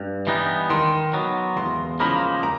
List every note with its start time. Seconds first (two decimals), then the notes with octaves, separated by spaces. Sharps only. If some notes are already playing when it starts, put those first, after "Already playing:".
Already playing: G2
0.27 E3 G3 B3 D#4
0.70 D#3 C6
1.13 F#3 B3
1.56 E2 C6
2.00 C#3 F3 A#3 D#4 B5
2.43 A#5